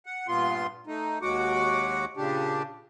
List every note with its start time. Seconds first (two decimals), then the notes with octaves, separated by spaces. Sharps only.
0.06 F#5
0.28 G2 A#2 B3 F4 C6
0.87 A3 D#4
1.22 D#2 F#3 G#3 F#4 F#5 D6
2.17 A#2 C#3 D4 G4